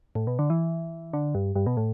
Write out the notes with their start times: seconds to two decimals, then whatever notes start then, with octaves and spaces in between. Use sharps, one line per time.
0.15 A2
0.27 B2
0.39 D3
0.50 E3
1.13 D3
1.35 G2
1.56 G2
1.67 B2
1.77 A2